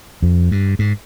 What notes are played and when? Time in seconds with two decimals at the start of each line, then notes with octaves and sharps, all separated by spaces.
0.22 F2
0.51 G2
0.79 G#2